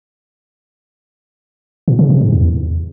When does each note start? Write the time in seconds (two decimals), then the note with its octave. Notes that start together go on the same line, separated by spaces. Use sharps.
1.88 A#2
1.99 C#3
2.10 C3
2.21 G#2
2.33 E2